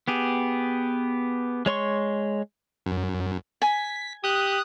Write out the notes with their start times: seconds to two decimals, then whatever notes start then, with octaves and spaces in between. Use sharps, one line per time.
0.08 B3 G4 G#4
1.66 G#3 C#5 C6 C#6
2.86 F#2
3.62 G#5 B6
4.24 G4 D#6 F#6